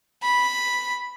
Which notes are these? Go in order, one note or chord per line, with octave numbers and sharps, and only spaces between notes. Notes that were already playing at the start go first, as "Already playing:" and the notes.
B5